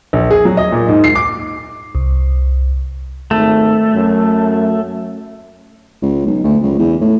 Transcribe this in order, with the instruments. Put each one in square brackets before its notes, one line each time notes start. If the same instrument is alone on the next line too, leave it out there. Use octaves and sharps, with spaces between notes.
[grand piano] A#1
G#4
F#3
D#5
A#2
G#2
C7
D6
[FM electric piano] C2
[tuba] G#1 [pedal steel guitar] A3
[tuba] F#2
[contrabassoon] C#2
B1
D2
C#2
E2
A2